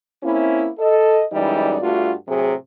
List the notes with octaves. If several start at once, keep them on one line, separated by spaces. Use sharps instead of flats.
A#3 C4 C#4 E4
A4 D#5
F#2 E3 G3 G#3 D#4 D5
G2 A3 F4 F#4
A2 C3 F#3 G#4